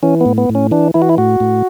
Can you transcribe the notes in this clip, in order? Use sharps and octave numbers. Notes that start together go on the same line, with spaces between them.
E3 C#4
B3
A2
B3
A2
C#4
E3 D4
E3 E4
F#4
E4
A2 F#4
A2